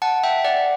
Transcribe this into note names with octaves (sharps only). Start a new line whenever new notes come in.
F#5 A5
E5 G5
D5 F#5